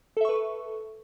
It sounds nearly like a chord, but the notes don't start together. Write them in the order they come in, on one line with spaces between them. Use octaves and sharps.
A4 E5 C#6 B4